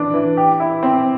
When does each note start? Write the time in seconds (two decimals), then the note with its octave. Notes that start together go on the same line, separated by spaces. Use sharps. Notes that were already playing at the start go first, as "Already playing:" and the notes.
Already playing: E3 D4
0.14 E3
0.37 G4
0.60 E4
0.83 C4